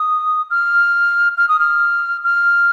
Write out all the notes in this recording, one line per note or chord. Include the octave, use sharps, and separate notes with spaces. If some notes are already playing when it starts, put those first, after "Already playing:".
Already playing: D#6
F6
F6
D#6
F6
F6